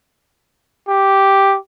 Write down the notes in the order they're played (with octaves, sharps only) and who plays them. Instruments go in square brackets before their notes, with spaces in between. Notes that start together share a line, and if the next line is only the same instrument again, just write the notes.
[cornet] G4